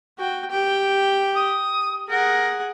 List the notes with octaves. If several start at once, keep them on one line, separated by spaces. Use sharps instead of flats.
F#4 G5
G4 G5
D#6
G#4 A#4 F#5